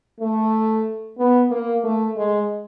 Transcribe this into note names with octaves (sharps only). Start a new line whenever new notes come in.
A3
B3
A#3
A3
G#3